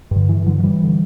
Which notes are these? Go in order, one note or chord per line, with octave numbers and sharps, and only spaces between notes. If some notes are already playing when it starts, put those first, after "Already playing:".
G2 D3
E3
D3 F#3
E3 G3
D3